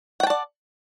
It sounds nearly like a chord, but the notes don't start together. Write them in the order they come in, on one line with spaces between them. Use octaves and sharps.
F#5 G5 A5 D5